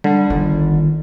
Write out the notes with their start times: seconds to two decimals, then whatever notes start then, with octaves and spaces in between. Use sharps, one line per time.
0.04 D3 G3
0.30 G1 D#3